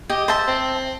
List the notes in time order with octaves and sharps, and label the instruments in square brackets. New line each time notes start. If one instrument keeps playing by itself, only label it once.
[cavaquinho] G4 [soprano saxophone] D#5
[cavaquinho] C5 E5 A5
[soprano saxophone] C4